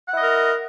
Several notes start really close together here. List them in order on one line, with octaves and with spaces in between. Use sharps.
F#5 E4 D#5 A#4